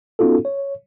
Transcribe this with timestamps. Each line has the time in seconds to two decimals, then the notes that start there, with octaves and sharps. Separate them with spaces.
0.19 B3 C#4 D#4 F4 F#4 A4
0.45 C#5